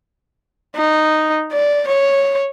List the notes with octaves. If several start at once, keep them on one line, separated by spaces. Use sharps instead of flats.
D#4
D5
C#5